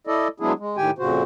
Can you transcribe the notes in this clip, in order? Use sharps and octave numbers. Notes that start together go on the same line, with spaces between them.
E4 A4 D5 D#5
F#3 G#3 B3 D4 E4 G#4
G#3
A2 D#3 G4 G5 G#5
F2 A#2 C#3 F#4 C5